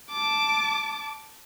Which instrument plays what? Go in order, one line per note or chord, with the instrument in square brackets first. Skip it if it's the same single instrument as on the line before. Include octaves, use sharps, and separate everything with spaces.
[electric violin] A5 D6